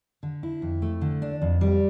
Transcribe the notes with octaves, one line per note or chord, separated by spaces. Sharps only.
D3
E4
F2
A3
D3
D4
F2
G3